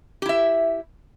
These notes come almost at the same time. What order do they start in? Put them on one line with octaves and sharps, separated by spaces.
G4 E4 E5